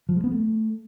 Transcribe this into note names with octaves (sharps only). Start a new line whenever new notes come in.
F3
G#3
B3
A3